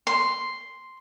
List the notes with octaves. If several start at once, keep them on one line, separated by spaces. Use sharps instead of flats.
C6